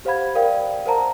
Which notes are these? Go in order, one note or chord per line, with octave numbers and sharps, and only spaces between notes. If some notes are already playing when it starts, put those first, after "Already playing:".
G4 C5 F5 F#5 B5 G#6
A#4 D5 F5 G5
A#4 C5 F#5 A5 A#5